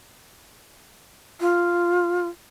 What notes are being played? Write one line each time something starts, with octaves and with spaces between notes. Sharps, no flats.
F4